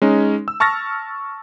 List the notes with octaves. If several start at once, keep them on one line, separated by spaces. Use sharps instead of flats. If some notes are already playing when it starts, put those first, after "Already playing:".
G#3 C#4 D#4
E6
A5 C#6 F6 A6 A#6